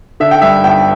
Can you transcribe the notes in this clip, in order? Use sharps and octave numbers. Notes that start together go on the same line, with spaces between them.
D3 E5
G5
G2 E5
G1 G5